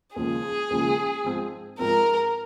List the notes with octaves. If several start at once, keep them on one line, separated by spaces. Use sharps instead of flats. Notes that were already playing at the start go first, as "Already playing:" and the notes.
D#2 C#3 F3 G#3 G#4
D#2 C#3 F3 G#3
G#2 F3 C4
G#2 F3 C4 A#4